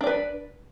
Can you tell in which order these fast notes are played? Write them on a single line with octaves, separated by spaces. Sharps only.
D4 D5 B4